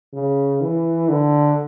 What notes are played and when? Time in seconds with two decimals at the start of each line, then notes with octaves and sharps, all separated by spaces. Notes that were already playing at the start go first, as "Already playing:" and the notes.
0.14 C#3
0.61 E3
1.09 D3